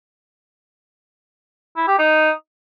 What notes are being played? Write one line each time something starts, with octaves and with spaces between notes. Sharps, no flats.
E4
G4
D#4